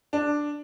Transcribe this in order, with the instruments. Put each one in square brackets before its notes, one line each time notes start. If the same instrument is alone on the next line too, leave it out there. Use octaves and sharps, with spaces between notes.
[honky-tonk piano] D4